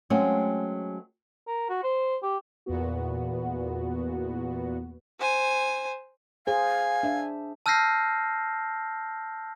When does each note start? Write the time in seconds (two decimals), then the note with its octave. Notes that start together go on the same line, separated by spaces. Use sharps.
0.10 F#3 G#3 A3 C4 C#4
1.47 A#4
1.70 F#4
1.83 C5
2.23 G4
2.66 E2 A#2 B3 F#4
5.20 C5 G#5
6.47 G#4 C5 F5 G#5
7.03 D4 E5
7.66 A5 E6 F6 G6 A#6 C7